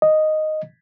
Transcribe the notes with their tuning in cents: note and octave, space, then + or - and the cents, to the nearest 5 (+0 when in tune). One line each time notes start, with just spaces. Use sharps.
D#5 -5